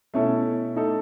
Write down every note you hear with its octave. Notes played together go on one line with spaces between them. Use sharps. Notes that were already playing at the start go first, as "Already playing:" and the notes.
B2 A3 C#4 E4 A4
A3 D#4 A4